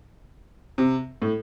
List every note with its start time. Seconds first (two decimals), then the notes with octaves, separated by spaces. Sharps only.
0.78 C3
1.22 A2